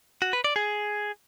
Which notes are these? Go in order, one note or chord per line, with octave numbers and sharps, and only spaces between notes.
F#4
B4
D5
G#4